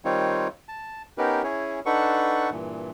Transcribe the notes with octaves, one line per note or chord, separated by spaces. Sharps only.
D#3 G3 C4 D#4 F4 C#5
A5
B3 C#4 D#4 G4 A#4 B4
C#4 E4 G#4 C#5
D4 D#4 A4 B4 F#5 C#6
G2 A#2 E3